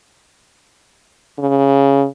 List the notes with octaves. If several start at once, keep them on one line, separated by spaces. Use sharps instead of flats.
C#3